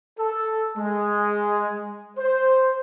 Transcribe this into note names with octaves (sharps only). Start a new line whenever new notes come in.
A4
G#3
C5